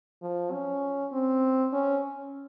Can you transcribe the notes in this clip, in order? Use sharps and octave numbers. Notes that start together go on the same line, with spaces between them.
F3
C#4
C4
C#4